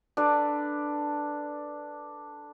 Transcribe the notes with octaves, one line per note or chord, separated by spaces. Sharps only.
D4 A4 B4 D5